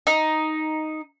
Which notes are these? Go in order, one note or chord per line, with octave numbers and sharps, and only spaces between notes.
D#4